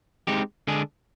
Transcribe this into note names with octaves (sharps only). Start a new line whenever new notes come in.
G#3 C4 D#4 G4
D3 G#3 D4 G#4